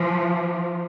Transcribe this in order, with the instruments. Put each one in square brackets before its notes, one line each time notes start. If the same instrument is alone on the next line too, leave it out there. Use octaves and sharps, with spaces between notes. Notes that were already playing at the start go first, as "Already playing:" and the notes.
Already playing: [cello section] F3